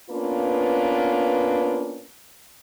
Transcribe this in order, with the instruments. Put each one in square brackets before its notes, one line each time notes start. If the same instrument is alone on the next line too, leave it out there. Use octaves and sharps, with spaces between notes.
[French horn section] A#3 B3 C#4 D4 F4 B4